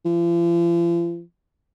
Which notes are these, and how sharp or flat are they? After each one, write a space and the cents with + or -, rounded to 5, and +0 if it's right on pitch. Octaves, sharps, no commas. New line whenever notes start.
F3 -45